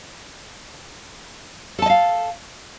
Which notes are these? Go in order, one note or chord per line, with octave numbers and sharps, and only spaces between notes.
A4 D#5 F5 A5